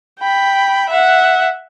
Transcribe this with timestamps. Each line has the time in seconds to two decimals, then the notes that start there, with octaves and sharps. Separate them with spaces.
0.19 G5 B5
0.89 E5 F#5